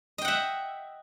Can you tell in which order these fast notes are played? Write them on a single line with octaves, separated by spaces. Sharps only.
D#5 G5 F#5 E5